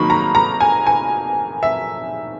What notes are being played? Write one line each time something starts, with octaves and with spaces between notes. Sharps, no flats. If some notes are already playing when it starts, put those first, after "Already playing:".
Already playing: D#3 F#3 A#3 D#4 B5 C#6
A#5
A#5
G#5
G#5
E5